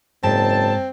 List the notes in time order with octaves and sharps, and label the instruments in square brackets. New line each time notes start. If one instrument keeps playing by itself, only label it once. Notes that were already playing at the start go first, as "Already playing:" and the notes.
[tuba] F#1 [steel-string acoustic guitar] G#2 [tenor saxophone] C4 [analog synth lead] A5